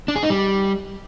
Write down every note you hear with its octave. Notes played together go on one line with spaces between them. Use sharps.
D4
G#4
D#4
G3